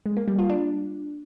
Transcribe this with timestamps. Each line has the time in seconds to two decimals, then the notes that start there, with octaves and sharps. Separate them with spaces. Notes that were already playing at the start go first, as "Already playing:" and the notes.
0.06 G#3
0.17 A#3
0.28 G3
0.38 F4
0.49 D4